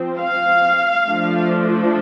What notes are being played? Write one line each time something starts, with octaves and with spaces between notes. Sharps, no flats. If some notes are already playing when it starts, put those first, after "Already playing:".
Already playing: F3 C4
F5
F3 A3 D4